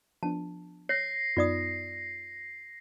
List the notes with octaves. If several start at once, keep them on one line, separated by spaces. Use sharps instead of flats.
F3 B3 D4 A5
C#5 A#6 C7
F#2 B3 D#4 F4 D5 D#6